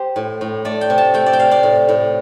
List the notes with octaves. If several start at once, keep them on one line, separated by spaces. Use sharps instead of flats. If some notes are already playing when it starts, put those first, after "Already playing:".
Already playing: G4 C5
A2
A2
A3 D5
G5
C3
A5
A3 G5
D5
G5
C3 F5
D5
A2
A2